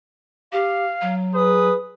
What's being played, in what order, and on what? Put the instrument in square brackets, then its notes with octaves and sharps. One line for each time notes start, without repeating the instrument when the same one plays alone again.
[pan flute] G4 [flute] F5
[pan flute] F#3
[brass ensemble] G#4 B4 [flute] D#6